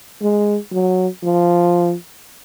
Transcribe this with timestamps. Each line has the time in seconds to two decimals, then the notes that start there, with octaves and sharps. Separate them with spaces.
0.22 G#3
0.72 F#3
1.23 F3